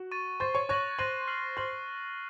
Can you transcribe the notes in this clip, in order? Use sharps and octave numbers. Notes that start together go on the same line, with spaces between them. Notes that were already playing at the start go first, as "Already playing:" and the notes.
Already playing: F#4
C#6 A6 D#7
C5 C6 C#6 A6 D#7
C#5 C#6
C#5 C#6 F#6 A#6 D#7 F#7
C5 C6 F#6 A#6 D#7 F#7
F6 C7 F#7
C5 C6 F6 C7 F#7